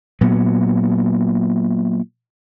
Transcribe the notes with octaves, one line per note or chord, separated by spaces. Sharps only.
A#2 F#3 B3